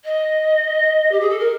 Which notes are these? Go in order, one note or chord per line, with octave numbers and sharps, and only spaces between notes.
D#5
G4
G#4
A4
A#4